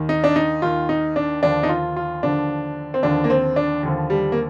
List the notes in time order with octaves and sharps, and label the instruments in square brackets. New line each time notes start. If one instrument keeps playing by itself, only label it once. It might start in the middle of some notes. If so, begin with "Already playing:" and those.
Already playing: [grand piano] D#2 D#3
D#4
D4
D#4
D#2 D#3 F4
D#4
D4
D#2 D3 F3 D4
D#4
F4
F4
D#2 D3 F3 D4
C4
D#2 D3 F3 D4
A#3
C4
D4
D#2 D3 F3
G3
A#3